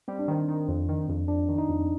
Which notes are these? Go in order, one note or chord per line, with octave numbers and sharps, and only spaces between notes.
G3 C4
D4
D#3 C4
D#3
F2
D#3
F2
F2 D4
D#3
D#4
F2